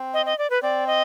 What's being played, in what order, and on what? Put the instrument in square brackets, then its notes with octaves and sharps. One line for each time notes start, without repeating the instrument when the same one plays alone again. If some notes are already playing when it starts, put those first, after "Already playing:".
Already playing: [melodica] C4
[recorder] D#5
D#5
D5
B4
[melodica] C4 [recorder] D5
[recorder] D#5